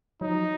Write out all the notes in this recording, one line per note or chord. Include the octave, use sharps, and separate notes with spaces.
F#3 D#4
F3
F#3